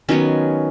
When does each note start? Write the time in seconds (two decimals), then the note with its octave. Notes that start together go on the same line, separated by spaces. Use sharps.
0.08 D#3 F#3 B3 C#4